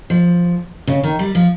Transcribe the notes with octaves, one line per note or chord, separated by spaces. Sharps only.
F3
C#3
D#3
G3
F3